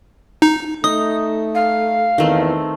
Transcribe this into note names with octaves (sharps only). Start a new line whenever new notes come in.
D#4
A3 D#4 D#6
F5
E2 D#3 A3 C4